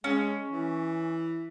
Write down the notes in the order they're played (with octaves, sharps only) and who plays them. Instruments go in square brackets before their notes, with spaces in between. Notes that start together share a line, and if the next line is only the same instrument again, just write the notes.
[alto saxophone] G#3 [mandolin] C#4
[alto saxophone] E3